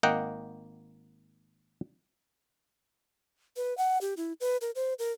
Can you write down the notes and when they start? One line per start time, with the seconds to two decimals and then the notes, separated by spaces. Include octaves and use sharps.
0.03 G#1 A#3 D#5 F#5 G5
3.57 B4
3.78 F#5
4.01 G4
4.17 E4
4.41 B4
4.61 A#4
4.75 C5
4.99 A#4